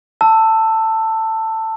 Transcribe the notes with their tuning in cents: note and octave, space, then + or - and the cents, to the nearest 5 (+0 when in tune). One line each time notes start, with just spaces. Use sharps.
A5 +15 E6 +0